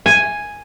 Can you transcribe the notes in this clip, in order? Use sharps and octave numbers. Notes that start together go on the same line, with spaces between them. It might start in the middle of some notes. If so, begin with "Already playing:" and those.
G#5